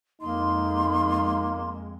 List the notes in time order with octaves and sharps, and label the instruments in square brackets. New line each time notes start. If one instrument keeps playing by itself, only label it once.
[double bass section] F2 G#3 [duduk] A#3 [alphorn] D#4 [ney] C6